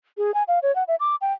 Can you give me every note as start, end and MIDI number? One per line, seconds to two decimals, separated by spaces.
0.18 0.34 68
0.34 0.43 80
0.48 0.59 77
0.63 0.74 73
0.76 0.83 78
0.88 0.95 76
1.00 1.16 86
1.21 1.32 79